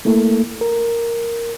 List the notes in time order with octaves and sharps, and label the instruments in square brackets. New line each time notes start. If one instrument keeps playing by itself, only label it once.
[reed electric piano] A3 A#3 E4 A4
A#4